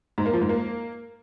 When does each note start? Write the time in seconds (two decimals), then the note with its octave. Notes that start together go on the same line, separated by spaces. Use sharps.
0.18 G#2
0.26 A#3
0.34 F3
0.41 G#2
0.49 A#3